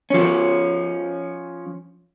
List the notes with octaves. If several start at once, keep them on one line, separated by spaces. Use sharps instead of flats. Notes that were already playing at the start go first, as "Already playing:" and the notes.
F3 C#4